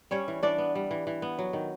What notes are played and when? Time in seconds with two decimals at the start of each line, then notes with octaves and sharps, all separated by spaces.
0.11 G3 C#4 C#5
0.28 E3
0.43 E3 D4 D5
0.58 B3
0.75 G3
0.91 E3
1.07 E3
1.22 B3
1.39 F#3
1.53 D#3